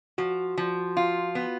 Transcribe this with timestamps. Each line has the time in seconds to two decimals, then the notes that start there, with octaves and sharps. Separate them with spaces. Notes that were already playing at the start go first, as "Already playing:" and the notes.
0.18 F3 F#4
0.58 F3
0.97 F4
1.35 B3